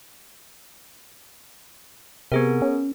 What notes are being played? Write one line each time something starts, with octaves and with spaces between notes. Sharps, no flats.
C3 B3 G#4 A#4
C#4